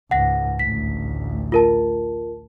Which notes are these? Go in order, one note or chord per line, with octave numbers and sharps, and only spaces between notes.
C#2 G#2 F#5 A#6
A1 D2 B6
F4 A#4 A5